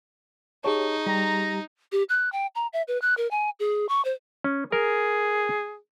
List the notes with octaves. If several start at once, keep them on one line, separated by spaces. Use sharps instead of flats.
D#4 G4 G#4 C#5 A5 C#6
G3 G4 A#5
G4
F#6
G5
A#5
E5
B4
F#6
A#4
G#5
G#4
C#6
C5
C#4
G#4 A#4